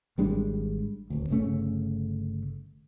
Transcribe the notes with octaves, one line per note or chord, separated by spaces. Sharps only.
G#1 G3 G#3 D4
D#1 D2
G1 C#3 A3 C#4